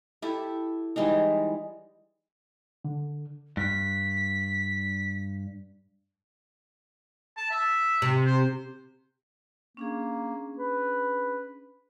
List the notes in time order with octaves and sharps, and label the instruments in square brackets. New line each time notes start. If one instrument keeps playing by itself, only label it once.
[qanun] E4 G4 A4
E3 G3 G#3 D#4
[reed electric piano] D3
[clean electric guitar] G2 [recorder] B6
[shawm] A5
E5
[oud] C3
[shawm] C5
[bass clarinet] A#3 [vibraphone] C#4 D4 G#4
[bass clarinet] B4